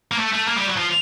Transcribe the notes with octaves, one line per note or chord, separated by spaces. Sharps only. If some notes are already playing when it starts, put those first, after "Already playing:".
A#3
A3
A3
A#3
G3
F#3
F3